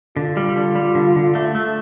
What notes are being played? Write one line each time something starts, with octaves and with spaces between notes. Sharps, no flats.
D3 F4
G3
D3
G3
D3
D3
A3
A3